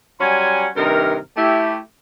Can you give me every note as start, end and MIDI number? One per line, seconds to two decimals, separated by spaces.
0.20 0.67 54
0.20 0.67 55
0.20 0.67 61
0.20 0.67 78
0.20 0.67 80
0.20 0.67 84
0.76 1.16 43
0.76 1.16 48
0.76 1.16 51
0.76 1.16 70
1.37 1.78 57
1.37 1.78 64
1.37 1.78 67